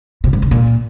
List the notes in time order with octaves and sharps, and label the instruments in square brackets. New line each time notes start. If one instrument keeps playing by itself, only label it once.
[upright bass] C3
G2
C#3
A#2